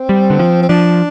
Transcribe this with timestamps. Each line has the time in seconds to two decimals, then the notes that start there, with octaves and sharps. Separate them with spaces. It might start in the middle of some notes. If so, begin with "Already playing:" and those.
Already playing: C4
0.09 G3
0.30 D3
0.39 F3
0.62 C4
0.69 F3 D4